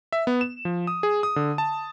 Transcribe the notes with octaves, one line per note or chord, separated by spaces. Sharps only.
E5
B3
E7
F3
D#6
G#4
D#6
D3
A5